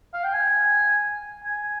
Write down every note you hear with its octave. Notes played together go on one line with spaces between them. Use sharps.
F5
G5
G#5
G#5